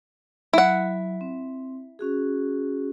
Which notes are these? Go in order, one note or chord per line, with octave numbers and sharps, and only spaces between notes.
F#3 E4 F#5
C4
C#4 F#4 G#4